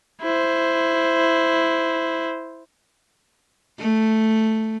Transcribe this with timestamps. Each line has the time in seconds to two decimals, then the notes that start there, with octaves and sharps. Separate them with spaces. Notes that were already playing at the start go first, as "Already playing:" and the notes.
0.22 E4 C5
3.79 A3